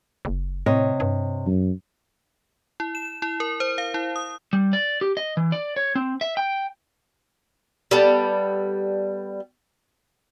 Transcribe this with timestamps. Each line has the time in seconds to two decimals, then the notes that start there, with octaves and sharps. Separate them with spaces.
0.25 F#1
0.66 A2 C3 C#5 D#5
1.00 G2
1.47 F#2
2.80 E4
2.95 E7
3.22 E4
3.40 A#4
3.60 C5
3.78 F5
3.94 E4
4.16 D#6
4.53 G3
4.73 D5
5.01 G4
5.17 D#5
5.37 E3
5.52 D5
5.76 C#5
5.95 C4
6.21 E5
6.37 G5
7.91 G3 B3 A4 A5